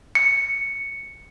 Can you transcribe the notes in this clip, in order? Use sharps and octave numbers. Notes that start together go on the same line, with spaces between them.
C#7